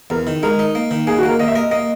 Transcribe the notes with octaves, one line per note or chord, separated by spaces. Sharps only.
E2 A#4
D#3
G#3 A#4
D#4
A#3
D#3
A#3 G#4
F#4
A#3
A#4
A#3 D#5
E5
A#4 D#5
A#3 D#5